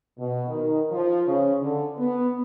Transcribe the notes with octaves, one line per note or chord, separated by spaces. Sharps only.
B2
D#3
F3
C#3
D3
B3